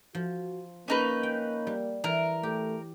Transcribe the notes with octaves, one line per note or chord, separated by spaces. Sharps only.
F3 F#4
A#3 C#4 D#4 B4
G5
G3
E3 A#4
A3 G4